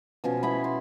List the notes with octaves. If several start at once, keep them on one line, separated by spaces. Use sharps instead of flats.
B2 F3 C#4
B3 E4 B5
C6